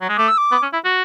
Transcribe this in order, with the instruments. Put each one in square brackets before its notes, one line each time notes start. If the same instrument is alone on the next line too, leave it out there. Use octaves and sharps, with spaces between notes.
[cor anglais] F#3
G#3
[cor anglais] A3 [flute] D6
[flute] E6
D6
[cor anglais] B3
C#4
E4
F#4